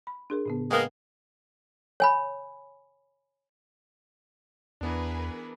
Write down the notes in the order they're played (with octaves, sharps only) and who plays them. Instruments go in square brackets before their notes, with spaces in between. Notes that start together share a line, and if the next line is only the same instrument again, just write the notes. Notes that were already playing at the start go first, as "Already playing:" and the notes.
[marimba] B5
D4 G#4 A#4
A2 C#3 B3
[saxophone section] G#3 A#3 B3 [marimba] A#4 F5 G5
[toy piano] C#5 G#5 B5
[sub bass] E2 [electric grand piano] E3 B3 D4 [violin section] G#4 A#4 B4